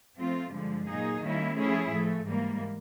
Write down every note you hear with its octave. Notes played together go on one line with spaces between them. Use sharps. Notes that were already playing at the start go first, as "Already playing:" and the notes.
F3 A3 C4 F4
G2 D3 F3 G#3
A#2 F#3 A#3 D#4 G#4
D#3 G3 A#3 C#4 E4
F3 A3 C#4 E4 G#4
A2 F3 A3
G#2 E3 G3 A#3